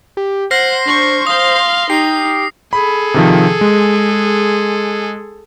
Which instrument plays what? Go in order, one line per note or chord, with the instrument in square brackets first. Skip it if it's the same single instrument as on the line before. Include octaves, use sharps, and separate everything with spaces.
[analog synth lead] G4
[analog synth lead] C5 [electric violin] F#5 [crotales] F6 A#6 C7
[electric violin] D4 C#6
[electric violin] F5 C6 [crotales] D#6
[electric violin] D#4 [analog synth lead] G4 [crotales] C7
[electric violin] G#4 A4 [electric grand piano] B5
[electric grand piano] C3 D#3 F3
G#3